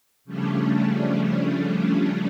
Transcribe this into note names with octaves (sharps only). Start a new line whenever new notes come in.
C#3 F3 G3 A3 C#4 D4